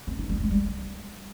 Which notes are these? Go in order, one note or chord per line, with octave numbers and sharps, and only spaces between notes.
C4
D#4
G3
G#3
G3